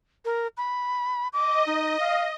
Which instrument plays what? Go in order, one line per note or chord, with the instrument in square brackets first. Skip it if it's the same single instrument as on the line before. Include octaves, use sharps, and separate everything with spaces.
[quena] A#4
B5
[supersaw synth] D#5 [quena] D6
[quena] D#4
F5